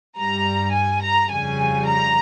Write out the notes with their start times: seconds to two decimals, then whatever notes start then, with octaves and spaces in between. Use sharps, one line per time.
0.16 G2 G3 A#5
0.73 G#5
1.02 A#5
1.30 F2 C#3 G3 G#5
1.87 A#5